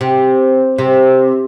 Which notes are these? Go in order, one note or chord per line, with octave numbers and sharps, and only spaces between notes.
C3
C3